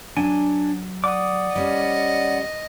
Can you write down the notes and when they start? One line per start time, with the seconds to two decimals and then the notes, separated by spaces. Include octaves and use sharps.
0.17 F#3 D4 G#5
1.04 D5 F#5 D6 D#6
1.55 G3 C#4 D#5